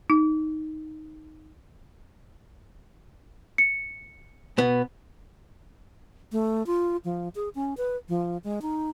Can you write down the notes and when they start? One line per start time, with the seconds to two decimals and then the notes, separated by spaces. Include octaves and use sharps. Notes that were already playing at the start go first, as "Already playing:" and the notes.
0.10 D#4
3.58 C#7
4.58 B2 B3
6.32 A3
6.66 F4
7.05 F3
7.35 G#4
7.55 C#4
7.77 B4
8.09 F3
8.44 G#3
8.62 D#4